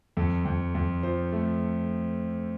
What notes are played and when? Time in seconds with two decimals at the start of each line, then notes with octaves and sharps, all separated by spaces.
0.17 F2 A4
0.45 F2
0.75 F2
1.03 F3 C5
1.32 A3